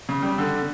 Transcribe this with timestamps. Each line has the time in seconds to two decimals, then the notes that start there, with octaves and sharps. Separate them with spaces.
0.09 C#3
0.22 G3
0.38 D3